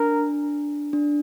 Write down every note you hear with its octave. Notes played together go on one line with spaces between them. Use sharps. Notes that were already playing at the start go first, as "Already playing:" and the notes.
Already playing: D4 A#4
D4